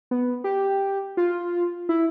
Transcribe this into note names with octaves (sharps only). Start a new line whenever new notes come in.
B3
G4
F4
E4